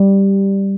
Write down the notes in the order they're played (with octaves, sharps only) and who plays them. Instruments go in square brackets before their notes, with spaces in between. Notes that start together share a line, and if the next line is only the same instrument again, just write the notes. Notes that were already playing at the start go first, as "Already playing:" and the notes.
Already playing: [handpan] G3